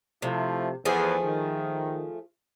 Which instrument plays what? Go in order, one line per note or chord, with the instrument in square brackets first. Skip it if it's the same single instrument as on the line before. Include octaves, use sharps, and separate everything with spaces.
[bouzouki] C3 [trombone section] F3 A3 E4
[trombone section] E2 [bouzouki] F3 A3 G#4
[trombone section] D#3